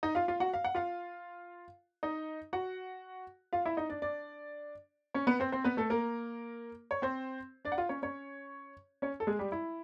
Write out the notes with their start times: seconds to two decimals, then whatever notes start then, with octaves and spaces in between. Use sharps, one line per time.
0.03 D#4 D#5
0.15 F4 F5
0.28 F4 F5
0.40 F#4 F#5
0.54 F5
0.65 F#5
0.75 F4 F5
2.03 D#4 D#5
2.53 F#4 F#5
3.53 F4 F5
3.65 E4 E5
3.77 D#4 D#5
3.90 D4 D5
4.02 D4 D5
5.14 C#4 C#5
5.27 B3 B4
5.40 C4 C5
5.52 C4 C5
5.64 B3 B4
5.77 A3 A4
5.90 A#3 A#4
6.91 C#5
7.02 C4 C5
7.65 D4 D5
7.72 F#5
7.78 F4 F5
7.89 C#4 C#5
8.02 C#4 C#5
9.02 C#4 C#5
9.20 A4
9.27 G#3 G#4
9.39 G3 G4
9.52 E4